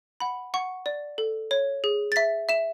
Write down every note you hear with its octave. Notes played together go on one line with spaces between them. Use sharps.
F#5 B5
F#5 C#6
D5
A4
C#5
G#4
A6
E5 B6
E5 E7